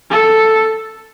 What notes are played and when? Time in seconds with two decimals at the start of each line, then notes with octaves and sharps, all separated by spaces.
0.10 A4